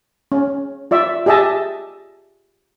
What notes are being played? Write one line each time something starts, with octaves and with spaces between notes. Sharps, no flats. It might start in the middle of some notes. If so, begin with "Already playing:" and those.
C#4
F4 D5 E5
G4 G#4 D#5 E5 A5